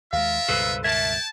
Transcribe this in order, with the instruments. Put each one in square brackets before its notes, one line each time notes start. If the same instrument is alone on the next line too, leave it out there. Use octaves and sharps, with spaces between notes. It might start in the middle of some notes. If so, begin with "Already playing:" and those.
[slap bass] D#2 G#3 [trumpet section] F4 A#4 E5 [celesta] F5
[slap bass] C#2 G2 B2 [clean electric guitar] A4 B4 C5
[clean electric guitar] A#4 E5 [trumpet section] G5 A5 [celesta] G#6